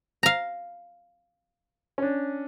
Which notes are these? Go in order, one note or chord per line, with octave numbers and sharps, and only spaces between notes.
F5 A#5
C#4 D4